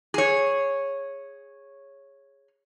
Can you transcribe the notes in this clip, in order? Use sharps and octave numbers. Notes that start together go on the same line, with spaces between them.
G#4 C#5